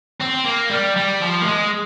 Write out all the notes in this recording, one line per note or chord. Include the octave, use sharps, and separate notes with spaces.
C4
A#3
G3
G3
F3
A#3
G#3